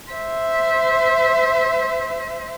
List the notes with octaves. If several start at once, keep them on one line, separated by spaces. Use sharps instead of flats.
C5 E5